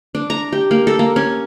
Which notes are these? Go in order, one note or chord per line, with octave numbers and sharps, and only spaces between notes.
D4
A#5
G4
A#3
A4
A#3
C#4